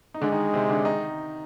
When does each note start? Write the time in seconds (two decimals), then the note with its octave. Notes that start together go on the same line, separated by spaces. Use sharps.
0.14 D#4
0.21 D3 G#3 D4
0.32 D#3 D#4
0.53 C3 C4
0.69 D3 D4
0.85 D#3 D#4